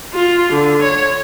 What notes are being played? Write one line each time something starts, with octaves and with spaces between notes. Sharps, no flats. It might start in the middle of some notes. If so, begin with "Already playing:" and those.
F4
D3
C#5